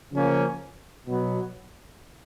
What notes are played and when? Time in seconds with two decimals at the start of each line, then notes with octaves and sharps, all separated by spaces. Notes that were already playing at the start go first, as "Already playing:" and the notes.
0.13 C#3 F3 A#3 C#4
1.06 B2 F#3 B3